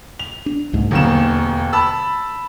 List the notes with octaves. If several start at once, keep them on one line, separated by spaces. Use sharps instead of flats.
F7
D4
C2 G#2 A3
E1 D#2 D3 F#3 C4 E7
A5 B5 E6